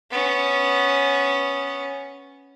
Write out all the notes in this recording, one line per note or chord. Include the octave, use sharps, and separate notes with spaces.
B3 C#4